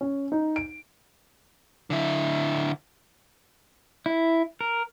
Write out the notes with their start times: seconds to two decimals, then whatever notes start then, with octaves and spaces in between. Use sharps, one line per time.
0.01 C#4
0.32 D#4
0.56 D7
1.90 D3 E4
4.06 E4
4.61 A#4